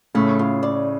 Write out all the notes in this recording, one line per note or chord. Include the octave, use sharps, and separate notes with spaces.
A2 C#3 A3
F4
D5